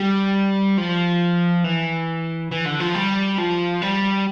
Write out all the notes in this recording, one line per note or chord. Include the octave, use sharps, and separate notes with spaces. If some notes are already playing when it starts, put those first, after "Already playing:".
Already playing: G3
F3
E3
E3
D3
F3
G3
F3
G3